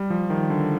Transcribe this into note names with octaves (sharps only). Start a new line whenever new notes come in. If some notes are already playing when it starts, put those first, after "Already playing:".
Already playing: G3
F3
D#3
D3